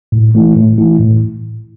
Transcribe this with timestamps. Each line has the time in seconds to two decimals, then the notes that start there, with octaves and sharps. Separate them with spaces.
0.12 A2
0.34 E3 A3 E4
0.56 A2
0.77 E3 A3 E4
0.99 A2